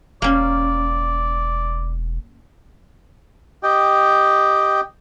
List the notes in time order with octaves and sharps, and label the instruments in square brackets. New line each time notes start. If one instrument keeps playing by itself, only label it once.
[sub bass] E1 [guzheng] A#3 C#4 [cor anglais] D5
[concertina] G4 D#5 G5